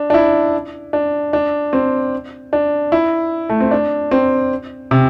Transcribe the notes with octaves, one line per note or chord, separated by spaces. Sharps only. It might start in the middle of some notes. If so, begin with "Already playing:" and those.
Already playing: D4
D4
E4
D4
D4
C4
D4
E4
A3
C4
D4
C4
C3